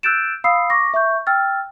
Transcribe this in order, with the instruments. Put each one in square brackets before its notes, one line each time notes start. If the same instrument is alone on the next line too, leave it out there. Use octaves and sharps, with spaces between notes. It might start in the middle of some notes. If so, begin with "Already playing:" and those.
[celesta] E6 F#6 G6 A6 D7 E7
F5 B5 D#6 E6 C7
C#6 D6 A#6
E5 C#6 G6
G5 E6 F6 A6